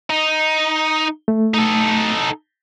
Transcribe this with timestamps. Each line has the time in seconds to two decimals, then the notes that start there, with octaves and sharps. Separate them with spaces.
0.10 D#4
1.28 A3
1.54 D#4 A4